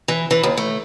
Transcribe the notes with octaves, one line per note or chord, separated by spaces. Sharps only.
E3
E3
D#2
A3